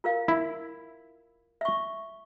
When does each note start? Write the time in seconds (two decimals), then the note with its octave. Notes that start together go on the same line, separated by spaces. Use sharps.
0.04 F4 A#4 F5
0.28 E4
1.61 E5 C#6